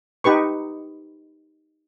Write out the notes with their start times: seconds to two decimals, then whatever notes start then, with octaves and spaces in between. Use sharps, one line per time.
0.24 D#4 G4 B4 C#6